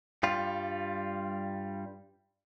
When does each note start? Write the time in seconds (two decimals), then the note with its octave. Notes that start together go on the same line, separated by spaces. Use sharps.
0.23 G2 G3 F4